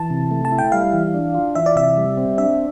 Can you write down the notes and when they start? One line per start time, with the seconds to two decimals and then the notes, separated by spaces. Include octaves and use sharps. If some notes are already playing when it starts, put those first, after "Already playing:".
Already playing: E3 A5
0.10 C3
0.31 A3
0.45 A5
0.52 E4
0.58 G5
0.72 G3 F5
0.93 E3
1.14 D4
1.34 F4
1.55 E3 E5
1.66 D5
1.76 C3 E5
1.97 G3
2.17 C4
2.38 D4 E5